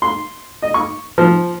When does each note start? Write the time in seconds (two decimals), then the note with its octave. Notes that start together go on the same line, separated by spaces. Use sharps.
0.02 C6
0.62 D#5
0.74 C#6
1.18 F3